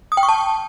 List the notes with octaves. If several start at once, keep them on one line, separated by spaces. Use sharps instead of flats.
D#6
G5
C#6
A5